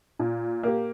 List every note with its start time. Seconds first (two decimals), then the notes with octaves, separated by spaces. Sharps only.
0.19 A#2
0.63 A#3 G4